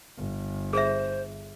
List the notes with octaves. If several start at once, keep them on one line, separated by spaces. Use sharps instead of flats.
G1
G#4 C5 E5